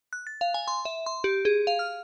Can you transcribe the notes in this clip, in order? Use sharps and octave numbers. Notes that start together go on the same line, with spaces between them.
F#6
A6
F5
G#5
C6
E5
C6
G4
G#4
F5
F6